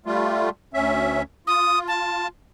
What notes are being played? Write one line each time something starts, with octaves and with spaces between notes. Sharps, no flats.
G3 A3 F4
D2 C#4 E5
F4 D#6
A5